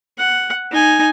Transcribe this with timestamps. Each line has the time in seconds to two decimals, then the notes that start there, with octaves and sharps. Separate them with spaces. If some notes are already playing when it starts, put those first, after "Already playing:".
0.18 F#5
0.71 D#4 G#5